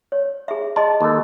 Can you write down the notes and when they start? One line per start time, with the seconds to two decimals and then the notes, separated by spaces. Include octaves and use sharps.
0.12 C#5
0.48 G#4 E5
0.76 G#4 D#5 A5 C6
1.01 D#2 A4